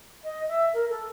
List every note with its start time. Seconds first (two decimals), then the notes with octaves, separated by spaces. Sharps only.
0.24 D#5
0.48 E5
0.74 A#4
0.90 A4